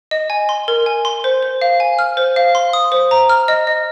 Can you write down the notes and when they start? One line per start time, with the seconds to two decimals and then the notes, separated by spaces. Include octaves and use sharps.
0.11 D#5
0.30 G#5
0.49 C6
0.68 A#4
0.86 G#5
1.05 C6
1.24 C5
1.43 C5
1.62 F5
1.80 G#5
1.99 F6
2.17 C5
2.36 F5
2.55 C6
2.73 D#6
2.92 C5
3.11 A#5
3.29 F6
3.48 D#5
3.67 D#5